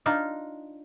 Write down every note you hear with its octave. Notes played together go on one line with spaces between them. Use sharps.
D4 D#4 F4